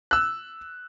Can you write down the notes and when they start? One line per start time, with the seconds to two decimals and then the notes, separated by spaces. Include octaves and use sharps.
0.11 E6 F#6